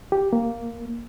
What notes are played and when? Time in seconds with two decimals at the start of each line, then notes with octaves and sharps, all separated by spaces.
0.12 G4
0.33 A#3